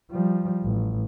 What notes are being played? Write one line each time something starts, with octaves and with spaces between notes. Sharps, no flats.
F3 G3
A1